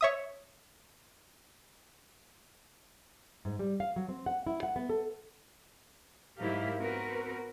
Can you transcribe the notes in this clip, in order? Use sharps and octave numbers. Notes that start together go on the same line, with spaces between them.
C#5 E5 D#6
G#2
G3
F5
F#3
C4
F#5
E4
F#5
B3
A4
G#2 F#3 E4 G4 A#4 F5
B3 C4 F#4 A#4 B4